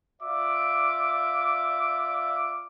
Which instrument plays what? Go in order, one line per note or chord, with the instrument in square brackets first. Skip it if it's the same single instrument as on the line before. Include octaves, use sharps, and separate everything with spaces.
[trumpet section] F4 D5 E5 D6